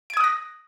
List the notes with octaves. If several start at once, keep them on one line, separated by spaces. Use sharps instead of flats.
D#6 F#6 G#6 A#6 D7